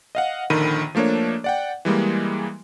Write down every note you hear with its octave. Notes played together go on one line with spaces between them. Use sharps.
D#5 F5 F#5
A#1 D3 D#3 B5 D#7
F3 A3 A#3 D4 C#5
D5 F#5 G5
E3 G3 G#3 A#3